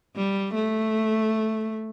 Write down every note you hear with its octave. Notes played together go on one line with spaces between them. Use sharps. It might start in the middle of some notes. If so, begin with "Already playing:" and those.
G3
A3